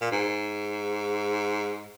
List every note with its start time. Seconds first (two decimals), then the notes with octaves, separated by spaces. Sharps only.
0.02 A#2
0.12 G#2